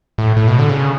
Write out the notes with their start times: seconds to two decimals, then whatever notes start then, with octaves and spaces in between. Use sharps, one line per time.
0.18 A2
0.37 A2
0.47 B2
0.59 D3
0.69 C#3